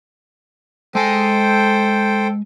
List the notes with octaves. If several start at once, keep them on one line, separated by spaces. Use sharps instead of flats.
G#3 A4 C5 G5 G#5